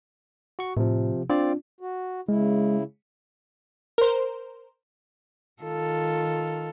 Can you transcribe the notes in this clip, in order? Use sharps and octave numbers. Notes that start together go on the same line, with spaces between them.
F#4 C#6
A2 C3 F3
C4 D4 F4 D5
F#4
C#3 G#3 E4
A#4 C5
D#3 F4 A4